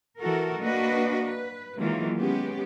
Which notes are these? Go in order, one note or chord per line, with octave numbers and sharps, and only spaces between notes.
E3 F#4 A4 A#4
A#3 D4 F#4 B4 D#5
B4
D#3 E3 F#3 G#3 A#3 F4
G#3 B3 C#4 G4